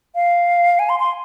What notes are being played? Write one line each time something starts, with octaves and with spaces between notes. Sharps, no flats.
F5
G#5
C6
C6